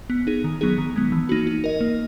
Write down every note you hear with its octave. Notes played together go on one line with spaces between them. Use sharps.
B3
D#4 G#4
D#3
F#3 B3 D#4 G#4
D#3
G#3 B3
E3
A#3 D#4 F#4
D#4
A#4 D#5
A#3